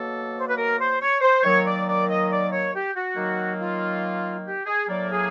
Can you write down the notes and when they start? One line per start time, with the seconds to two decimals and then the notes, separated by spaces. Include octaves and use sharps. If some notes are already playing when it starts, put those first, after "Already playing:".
Already playing: B2 F#3 A#3 A4
0.37 C5
0.47 B4
0.56 A#4
0.79 C5
1.00 C#5
1.21 C5
1.43 D#3 F#3 A#3 C#5
1.64 D5
1.87 D5
2.08 D#5
2.29 D5
2.51 C#5
2.73 G4
2.93 F#4
3.15 D#3 F#3 A#3
3.58 F4
4.46 G4
4.66 G#4
4.88 A2 F#3 A#3 D5
5.10 G#4